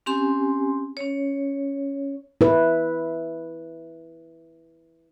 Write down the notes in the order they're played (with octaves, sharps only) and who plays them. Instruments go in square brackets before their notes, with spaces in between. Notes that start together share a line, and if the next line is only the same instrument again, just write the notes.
[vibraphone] C4 C#4 G4 G#5 C6
C#4 C#5
[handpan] E4 B4